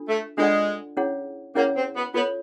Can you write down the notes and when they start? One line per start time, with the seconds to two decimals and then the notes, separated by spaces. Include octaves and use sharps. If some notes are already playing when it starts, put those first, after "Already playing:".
Already playing: D4 F4 A4
0.08 A3
0.38 G#3 D4 F4 A4 D5 F#5
0.97 C#4 E4 G#4 C#5 F#5
1.55 A#3 C#4 E4 G#4 C#5 F#5
1.76 C4
1.95 B3
2.14 B3 F4 A4 C#5